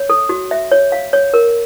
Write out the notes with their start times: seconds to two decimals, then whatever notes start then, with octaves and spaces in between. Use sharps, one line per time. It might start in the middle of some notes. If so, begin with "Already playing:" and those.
Already playing: C#5
0.10 A4
0.29 F#4
0.51 E5
0.72 C#5
0.92 F5
1.13 C#5
1.34 A#4